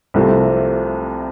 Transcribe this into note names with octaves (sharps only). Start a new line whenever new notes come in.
C2 C3 F3 A3 C4